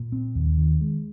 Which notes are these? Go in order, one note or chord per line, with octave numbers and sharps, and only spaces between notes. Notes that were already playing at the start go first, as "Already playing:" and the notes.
Already playing: A#2
C4
D#2
D#3
G#3